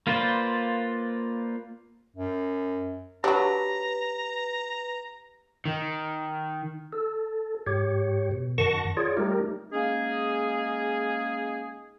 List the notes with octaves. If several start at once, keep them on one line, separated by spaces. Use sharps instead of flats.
A#3 F4 B4 C5 D5
F#2
F#3 D4 G4 B4 A#5 B5
D#3
A4
G#2 G4 C#5
B2
F#2 D#3 F#5 A5 C#6 A#6
F4 G#4 C#5 D5
G3 A3 D#4 G4 A#4
G#3 A#3 C#4 D#4 G#4